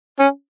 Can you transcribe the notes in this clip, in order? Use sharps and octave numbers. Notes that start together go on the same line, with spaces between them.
C#4